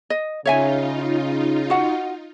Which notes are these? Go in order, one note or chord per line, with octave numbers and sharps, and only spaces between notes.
D#5
C#3 D#4 F4 C#5 E5 G#5
F#4 F#5